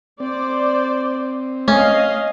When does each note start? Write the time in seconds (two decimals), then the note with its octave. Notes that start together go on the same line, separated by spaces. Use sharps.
0.20 C4 C5 D5
1.68 A3 C#4 D#5 F5